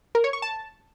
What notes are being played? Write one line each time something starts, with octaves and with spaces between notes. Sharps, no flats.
A#4
C#5
C#6
A5